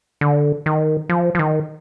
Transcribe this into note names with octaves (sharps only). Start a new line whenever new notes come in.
D3
D#3
F3
F3
D#3